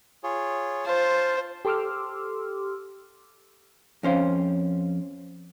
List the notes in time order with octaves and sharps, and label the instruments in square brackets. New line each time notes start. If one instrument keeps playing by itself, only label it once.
[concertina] F4 G#4 C#5
[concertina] F4 F5 A5 [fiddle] C5
[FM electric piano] G4 A4 C6 D6 E6 F6
[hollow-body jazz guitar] F2 C#4 C5 F5